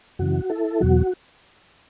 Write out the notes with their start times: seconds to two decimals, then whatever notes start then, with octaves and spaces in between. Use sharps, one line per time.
0.19 F#2 C#3 E3 F#4
0.49 E4 A4
0.80 E2 B2 F#3 F#4